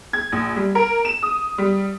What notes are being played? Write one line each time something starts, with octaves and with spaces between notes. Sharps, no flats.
G#6
A#1
G3
A#4
E7
D#6
G3